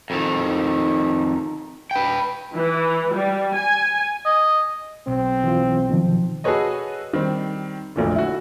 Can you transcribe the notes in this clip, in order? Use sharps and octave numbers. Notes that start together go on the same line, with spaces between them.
F2 D#3
B4 G5
E3
G3
G#5
D#5
B1 C4
E3 F4
B2 D#3 F3
F#4 G#4 A4 B4 C#5 D#5
D#3 G3 C4
F1 B1 A#2 D3
E4 F#4